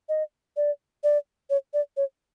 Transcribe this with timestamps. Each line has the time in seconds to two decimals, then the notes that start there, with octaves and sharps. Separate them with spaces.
0.09 D#5
0.57 D5
1.04 D5
1.50 C#5
1.74 D5
1.97 C#5